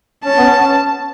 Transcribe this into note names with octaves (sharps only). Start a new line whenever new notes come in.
C#4 A5
B3
C#4